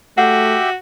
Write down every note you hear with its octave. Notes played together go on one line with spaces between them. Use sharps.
A3 F#4 G4 E5 F#5 G5